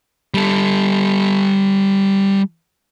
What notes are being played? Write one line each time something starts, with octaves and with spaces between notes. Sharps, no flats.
G3 A4